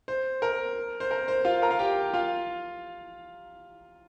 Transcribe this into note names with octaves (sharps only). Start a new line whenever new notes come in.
C5
A#4
C5
A#4
C5
F4 F5
A#4 A#5
F5
G4 G5
F4 F5